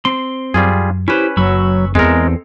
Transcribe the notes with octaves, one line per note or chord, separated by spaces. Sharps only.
C4 C6
F#2 G3 F4 G#4
C#4 E4 G4 B4 C5
F#1 F#3 B5 C#6 E6
E2 G#3 C4 A4 A#4